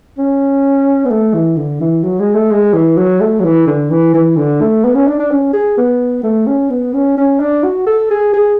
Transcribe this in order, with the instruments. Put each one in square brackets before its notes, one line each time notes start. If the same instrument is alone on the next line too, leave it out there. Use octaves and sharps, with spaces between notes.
[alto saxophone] C#4
B3
A3
E3
D3
E3
F#3
G#3
A3
G#3
E3
F#3
A3
F#3
E3
D3
E3
E3
D3
A3
B3
C#4
D4
D4
C#4
G#4
B3
A3
C#4
B3
C#4
C#4
D4
F#4
A4
G#4
G#4